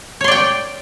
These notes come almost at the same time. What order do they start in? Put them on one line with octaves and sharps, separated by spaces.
C#5 C6 D5 G5